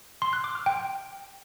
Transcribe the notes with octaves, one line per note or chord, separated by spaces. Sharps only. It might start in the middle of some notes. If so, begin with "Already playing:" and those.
C6
F#6
D6
F6
G5